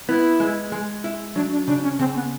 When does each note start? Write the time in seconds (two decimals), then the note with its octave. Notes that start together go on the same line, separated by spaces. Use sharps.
0.08 B3 E4
0.40 G#3
0.72 G#3
1.04 E4
1.36 F#3 D4
1.52 D4
1.68 C#3 D4
1.83 C#4
1.99 C#3 C4
2.15 B3